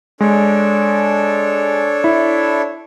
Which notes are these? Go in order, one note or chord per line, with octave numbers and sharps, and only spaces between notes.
G#3 D4 A4 C#5
E4